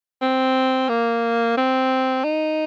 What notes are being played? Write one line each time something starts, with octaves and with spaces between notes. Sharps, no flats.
C4
A#3
C4
D#4